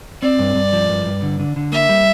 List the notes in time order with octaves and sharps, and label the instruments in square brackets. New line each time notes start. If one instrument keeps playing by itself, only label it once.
[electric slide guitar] C4 [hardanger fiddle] D5
[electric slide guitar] G2
G2
F3
G2
G2
D3
D3
D3
[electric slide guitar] A#3 [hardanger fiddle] E5
[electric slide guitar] G3